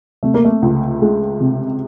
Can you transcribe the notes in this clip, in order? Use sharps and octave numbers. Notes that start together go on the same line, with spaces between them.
C3 A3
A#3
A3
C#2
G#3
C3